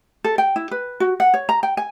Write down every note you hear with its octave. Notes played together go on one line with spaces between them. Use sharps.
A4
G5
E4
B4
F#4
F#5
C#5
A#5
G5
G#5